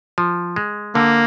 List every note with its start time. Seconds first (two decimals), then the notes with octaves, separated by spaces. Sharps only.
0.18 F3
0.56 G#3
0.95 D3 A#3